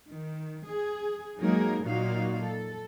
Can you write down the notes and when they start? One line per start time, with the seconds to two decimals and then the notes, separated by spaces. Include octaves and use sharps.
0.12 D#3
0.68 G#4
1.39 F#3 G#3 A#3 D#4 G#4 A#4
1.85 A#2 F#3 A#3 D#4 F#4 F5
2.44 A4